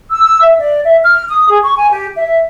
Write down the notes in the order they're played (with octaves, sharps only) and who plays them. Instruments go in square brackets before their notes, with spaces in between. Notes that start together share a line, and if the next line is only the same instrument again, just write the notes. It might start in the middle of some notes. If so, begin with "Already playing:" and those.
[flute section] E6
E6
E5
D5
E5
F6
D#6
G#4
C#6
G#5
G4
E5